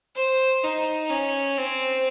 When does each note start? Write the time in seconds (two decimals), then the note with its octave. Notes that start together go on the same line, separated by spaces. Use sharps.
0.17 C5
0.64 D#4
1.10 C#4
1.58 C4